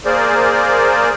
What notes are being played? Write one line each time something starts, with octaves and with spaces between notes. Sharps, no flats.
A#3 G#4 A#4 C5 D5